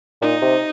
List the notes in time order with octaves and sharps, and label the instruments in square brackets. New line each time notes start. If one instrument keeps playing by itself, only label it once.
[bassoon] A#2 [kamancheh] D#4
[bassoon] C3